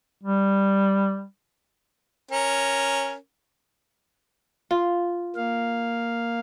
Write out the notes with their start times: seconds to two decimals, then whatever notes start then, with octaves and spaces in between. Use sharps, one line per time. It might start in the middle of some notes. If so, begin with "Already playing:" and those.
0.23 G3
2.31 C#4 A#4
4.71 F4
5.36 A#3 F5